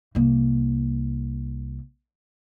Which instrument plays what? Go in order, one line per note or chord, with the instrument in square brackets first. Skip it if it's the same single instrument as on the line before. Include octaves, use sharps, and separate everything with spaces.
[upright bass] C2 A#3